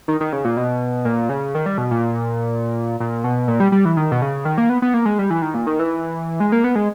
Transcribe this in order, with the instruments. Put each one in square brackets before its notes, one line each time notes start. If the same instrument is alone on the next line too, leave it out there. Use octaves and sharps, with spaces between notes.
[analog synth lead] D#3
D#3
C#3
A#2
B2
A#2
C#3
D#3
G3
B2
A#2
A#2
B2
A#2
G3
G3
E3
D#3
B2
C#3
D#3
A#3
B3
B3
A#3
G#3
G3
E3
D#3
A#2
D#3
E3
G#3
A#3
B3
G#3